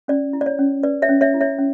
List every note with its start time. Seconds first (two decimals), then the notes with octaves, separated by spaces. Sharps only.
0.08 C#4 D5
0.33 E4
0.41 D5
0.46 C#5
0.59 C#4
0.83 B4 D5
1.02 C#5 E5
1.09 C#4
1.21 C#5 E5
1.34 E4
1.40 C#5 E5
1.59 C#4